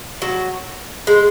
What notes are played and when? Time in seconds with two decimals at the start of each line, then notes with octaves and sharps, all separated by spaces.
0.22 F#3
1.07 G#3